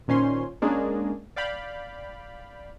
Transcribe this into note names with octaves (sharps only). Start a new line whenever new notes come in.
A#2 D#3 C#4 C5 C6
G#3 A#3 C#4 D4 G#4
D5 F5 G5 B5